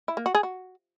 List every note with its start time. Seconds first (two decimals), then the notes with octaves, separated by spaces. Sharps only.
0.08 E4
0.17 A#3
0.26 F#4
0.35 G#4
0.43 F#4